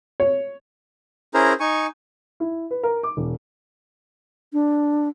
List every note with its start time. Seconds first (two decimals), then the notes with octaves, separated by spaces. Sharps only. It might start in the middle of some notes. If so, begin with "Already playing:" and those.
0.20 C#5
1.34 C#4 E4 G#4 A#4 C5 A#5
1.60 D#4 G#5 C#6
2.40 E4
2.71 B4
2.83 A#4
3.03 D6
3.17 E1
4.53 D4